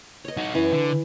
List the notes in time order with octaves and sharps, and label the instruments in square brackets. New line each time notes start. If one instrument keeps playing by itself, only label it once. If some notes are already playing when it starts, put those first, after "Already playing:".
[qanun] C#5 D#5
[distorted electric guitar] D#4 F#4
[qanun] E3 [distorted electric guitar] C#4 F#4
[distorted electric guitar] D3